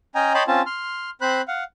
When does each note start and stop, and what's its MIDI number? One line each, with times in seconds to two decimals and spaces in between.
0.15 0.33 61
0.15 0.33 75
0.15 0.33 79
0.15 0.33 80
0.15 0.33 82
0.34 0.43 73
0.34 0.43 75
0.34 0.43 79
0.34 0.43 81
0.34 0.43 83
0.34 0.43 84
0.47 0.62 60
0.47 0.62 61
0.47 0.62 65
0.47 0.62 81
0.66 1.10 84
0.66 1.10 89
1.21 1.42 60
1.21 1.42 72
1.21 1.42 83
1.21 1.42 90
1.48 1.64 77
1.48 1.64 78